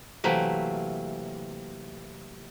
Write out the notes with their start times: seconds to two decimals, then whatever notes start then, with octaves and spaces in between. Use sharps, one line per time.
0.24 C3 E3 F#3 A3 A#3